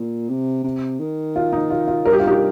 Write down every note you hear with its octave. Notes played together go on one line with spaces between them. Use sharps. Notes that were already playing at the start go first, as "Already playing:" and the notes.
Already playing: A#2
C3
C3
D#3
F4
D#4
F4
F4
G2 A#4
G4
F4
D#4 G4